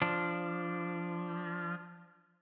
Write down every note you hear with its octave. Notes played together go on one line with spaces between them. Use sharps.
F3 D4